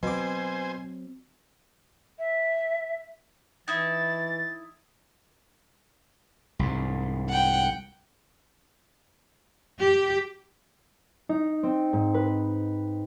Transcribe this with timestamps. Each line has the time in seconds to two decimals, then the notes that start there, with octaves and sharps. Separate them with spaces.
0.03 B2 F#3 C4 C5 G#5 D6
2.19 E5
3.68 E3 D#4 E4 E5 A6
6.59 C2 G#2
7.30 F#5 G5
9.82 G4
11.29 D#4
11.63 C4
11.93 G#2
12.14 B4